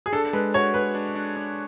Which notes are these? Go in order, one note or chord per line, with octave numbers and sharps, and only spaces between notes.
G#4
D4 A4
G#3 B4
F#4 C#5
G#3 B4
D4
D4
D4